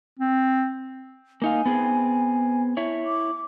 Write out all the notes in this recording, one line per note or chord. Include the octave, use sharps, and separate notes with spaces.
C4
A#3 D#4 F5 G#5
B3 C4 G#4
E4 C#5
D6